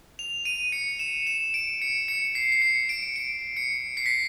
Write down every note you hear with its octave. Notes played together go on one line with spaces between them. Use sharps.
F7
D#7
C#7
E7
E7
D7
C#7
C#7
C7
C7
C#7
D7
D7
C#7
C7
B6